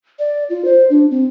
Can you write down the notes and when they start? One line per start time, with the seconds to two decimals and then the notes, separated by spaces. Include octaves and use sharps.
0.19 D5
0.50 F4
0.65 C5
0.90 D4
1.11 C4